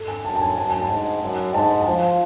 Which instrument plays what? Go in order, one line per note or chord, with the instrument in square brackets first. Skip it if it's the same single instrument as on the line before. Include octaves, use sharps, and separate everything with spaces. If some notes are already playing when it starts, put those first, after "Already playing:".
Already playing: [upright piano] A4
G#5
[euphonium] F#2 [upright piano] A5
[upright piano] A5
G#5
[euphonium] F#2 [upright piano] A5
[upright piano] G#5
A5
[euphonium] G#2
F#2
[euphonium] G#2 [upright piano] A5
[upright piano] A5
[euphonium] F3 [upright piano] G#5